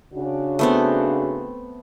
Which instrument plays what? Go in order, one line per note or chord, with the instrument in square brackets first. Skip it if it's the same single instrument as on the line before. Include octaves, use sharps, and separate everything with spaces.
[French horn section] C#3 D4 F#4
[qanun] A3 B3 C4